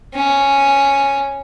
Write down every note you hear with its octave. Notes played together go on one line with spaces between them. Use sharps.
C#4